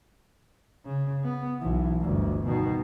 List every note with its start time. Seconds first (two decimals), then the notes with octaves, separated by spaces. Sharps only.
0.85 C#3
1.24 B3
1.60 B1 E3
2.01 G1 D2
2.47 B2 D#3